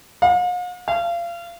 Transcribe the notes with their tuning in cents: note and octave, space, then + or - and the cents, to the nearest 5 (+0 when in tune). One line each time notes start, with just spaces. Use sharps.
F5 +45
F5 -30